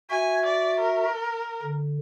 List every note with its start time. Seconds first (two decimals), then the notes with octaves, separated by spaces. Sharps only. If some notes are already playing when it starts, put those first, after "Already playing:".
0.10 F#4 E5 G#5
0.46 D5
0.80 A#4
1.62 D3